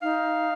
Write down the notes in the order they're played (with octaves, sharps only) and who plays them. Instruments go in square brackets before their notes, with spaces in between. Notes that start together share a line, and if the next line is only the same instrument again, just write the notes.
[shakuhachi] D#4 [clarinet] F5